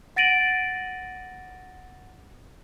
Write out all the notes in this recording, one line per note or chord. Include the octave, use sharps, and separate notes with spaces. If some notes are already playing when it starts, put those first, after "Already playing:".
F#5 A6 A#6 D7 D#7 F#7